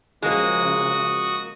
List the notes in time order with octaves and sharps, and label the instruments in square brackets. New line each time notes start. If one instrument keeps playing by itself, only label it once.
[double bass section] C#3 F3 [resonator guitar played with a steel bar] G#3 A#3 [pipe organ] F#4 D#6